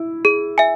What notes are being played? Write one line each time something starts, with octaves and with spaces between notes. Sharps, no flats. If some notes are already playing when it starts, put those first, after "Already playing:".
Already playing: E4
G#4
E5 G#5